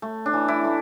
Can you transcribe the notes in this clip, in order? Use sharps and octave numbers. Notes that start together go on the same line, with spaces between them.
A3
D4
E3
E4
A3